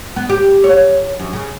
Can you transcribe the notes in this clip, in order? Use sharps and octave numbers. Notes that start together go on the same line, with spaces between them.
B3
G4
C#5
F#2
C#3